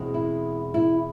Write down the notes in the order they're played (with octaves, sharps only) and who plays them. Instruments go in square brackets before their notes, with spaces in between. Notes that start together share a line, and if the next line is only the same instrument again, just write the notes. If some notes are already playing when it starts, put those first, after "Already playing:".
Already playing: [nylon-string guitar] E2 B2 G#3 C4
E4
E4